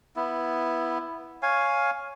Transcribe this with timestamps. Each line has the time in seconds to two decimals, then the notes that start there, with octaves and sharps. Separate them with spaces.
0.16 B3 E4
1.42 C#5 F5 G#5